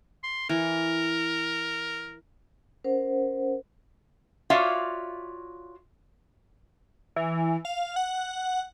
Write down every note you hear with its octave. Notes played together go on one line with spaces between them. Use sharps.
C6
E3 A#4
C#4 A#4 C5 F#5
F4 F#4 C#5 D5 E5 F5
E3
F5
F#5